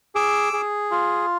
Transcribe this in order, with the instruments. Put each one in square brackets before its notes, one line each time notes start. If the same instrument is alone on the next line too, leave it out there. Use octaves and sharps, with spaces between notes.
[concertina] G#4 D6 E6
G#4
F4